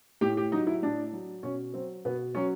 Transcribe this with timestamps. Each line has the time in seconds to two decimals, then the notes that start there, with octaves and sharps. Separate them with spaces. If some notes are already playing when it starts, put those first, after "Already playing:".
0.21 A2 G4
0.37 G4
0.52 F#3 D#4
0.67 E4
0.82 A2 D4
1.13 F#3
1.43 B2 C#4
1.74 F#3 C4
2.05 B2 B3
2.35 F#3 C#4